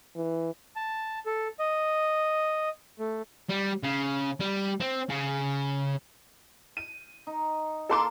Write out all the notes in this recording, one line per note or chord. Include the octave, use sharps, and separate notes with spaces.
E3
A5
A4
D#5
A3
G3
C#3
G3
C4
C#3
D#7
D#4
A#3 A4 A#4 C6 D6